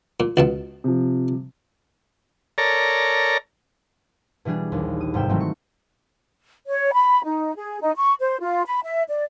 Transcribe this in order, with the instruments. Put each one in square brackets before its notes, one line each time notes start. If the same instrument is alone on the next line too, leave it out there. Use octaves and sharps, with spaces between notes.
[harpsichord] A#2
C#2 B2 A5
[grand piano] C3 F3
[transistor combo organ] A4 A#4 C#5 D5 A#5
[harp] B2 E3 G3 D4 G#4
A#1 D#2
D#6
G1 G#2 C3 G5 E7
D#3 E3 F#3 A3 C4 D#4
C#6
[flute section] C#5
B5
D#4
G#4
D#4
C#6
C5
F4
B5
E5
D5